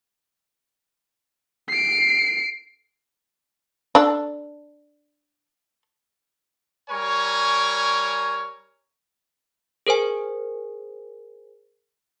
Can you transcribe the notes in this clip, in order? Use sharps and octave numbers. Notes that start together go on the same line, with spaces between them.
C7 D7
D4 A4
G3 A#4 C#5 G#5 C#6
G#4 A#4 C5 G#5